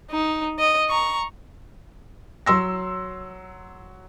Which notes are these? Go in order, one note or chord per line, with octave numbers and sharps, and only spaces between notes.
D#4
D#5
A#5 C#6
F#3 C6 E6 A#6